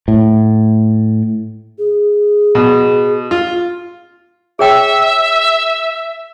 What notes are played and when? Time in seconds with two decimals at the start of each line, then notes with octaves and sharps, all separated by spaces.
0.08 A2
1.79 G#4
2.55 B2
3.31 F4
4.59 G#4 C#5 E5 G5